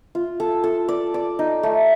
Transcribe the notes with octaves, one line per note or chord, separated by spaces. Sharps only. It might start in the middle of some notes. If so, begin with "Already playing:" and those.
F4
A4
A4
D5
D5
D#4
A3